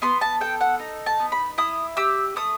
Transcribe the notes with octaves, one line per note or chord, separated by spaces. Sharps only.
B3 C6
A5
A4 G5
F#5
D#4
A5
B3
B5
E4 D#6
G4 E6
A3 D#6